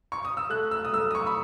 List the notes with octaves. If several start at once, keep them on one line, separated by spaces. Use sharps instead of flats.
C#6
D#6
E6
A3 F#6
E6
D#6
A3 E6
D#6
C#6
B5